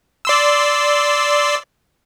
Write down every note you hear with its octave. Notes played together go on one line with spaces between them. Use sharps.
D5 C6 E6